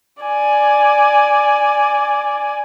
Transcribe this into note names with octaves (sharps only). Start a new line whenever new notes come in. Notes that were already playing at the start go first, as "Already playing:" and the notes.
D5 G#5